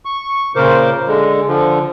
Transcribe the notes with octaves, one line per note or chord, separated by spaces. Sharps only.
C#6
A#2 C#3 A#4 C5 D6
D3 G#3
D3 F3